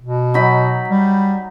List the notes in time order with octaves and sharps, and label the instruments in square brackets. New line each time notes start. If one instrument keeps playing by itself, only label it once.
[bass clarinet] B2
[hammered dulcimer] F#3 D#4 B5
[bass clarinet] G3